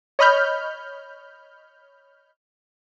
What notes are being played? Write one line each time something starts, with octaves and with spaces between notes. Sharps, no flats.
C#5 D#5 B5 F6 G6